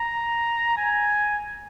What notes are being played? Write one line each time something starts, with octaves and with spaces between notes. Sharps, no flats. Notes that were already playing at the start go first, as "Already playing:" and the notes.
Already playing: A#5
G#5